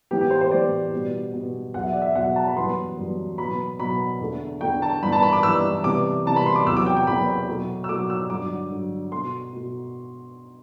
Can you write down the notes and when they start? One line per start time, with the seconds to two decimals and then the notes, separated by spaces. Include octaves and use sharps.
0.11 A2 E3 B3 G4
0.21 G4
0.31 C5
0.41 C5
0.51 A2 E3 B3 D5
0.92 B2 G3 B3
1.33 B2 G3 B3
1.74 E2 B2 F#3 F#5
1.83 E5
1.93 D5
2.02 E5
2.15 E2 B2 F#3 F#5
2.36 A5
2.47 B5
2.57 F#2 E3 G3 B3 C6
2.98 F#2 E3 G3 B3
3.38 B2 B5
3.41 F#3 B3
3.79 B2 F#3 B3 B5
4.20 E2 D3 A3
4.61 E2 D3 A3 G5
4.82 A5
5.03 G2 E3 G3 B3 B5
5.12 A5
5.22 B5
5.33 D6
5.43 G2 E3 G3 B3 E6
5.84 C3 E3 G3 B3 D6
6.25 C3 E3 G3 B3 A5
6.36 B5
6.46 C6
6.56 D6
6.66 E2 C3 F#3 B3 E6
6.77 D6
6.86 G5
6.96 G5
7.07 E2 C3 F#3 B3 B5
7.47 B2 F#3 A3
7.84 E6
7.89 B2 F#3 A3 D6
8.10 E6
8.30 G2 D3 F#3 D6
8.70 G2 D3 F#3
9.12 B2 A3 C6
9.53 B2 A3